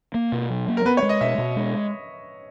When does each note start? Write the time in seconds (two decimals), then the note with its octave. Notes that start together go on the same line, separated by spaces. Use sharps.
0.14 A#3
0.32 B2
0.50 F#3
0.68 A#3
0.77 A#4
0.85 B3 B4
0.97 C#5
1.02 G#3
1.09 D#5
1.21 B2 E5
1.38 B2
1.56 G#3